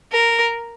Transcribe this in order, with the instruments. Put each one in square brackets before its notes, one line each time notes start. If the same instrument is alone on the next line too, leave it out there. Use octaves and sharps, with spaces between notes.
[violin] A#4